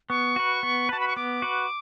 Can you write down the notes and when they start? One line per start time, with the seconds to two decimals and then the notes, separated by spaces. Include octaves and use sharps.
0.09 B3 C#6
0.36 F#4 B4
0.63 B3
0.89 F#4 B4 A5
1.00 B5
1.08 C#6
1.16 B3 D6
1.42 F#4 B4